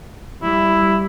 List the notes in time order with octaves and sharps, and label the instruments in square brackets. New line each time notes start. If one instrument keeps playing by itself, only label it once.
[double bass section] G3 [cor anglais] E4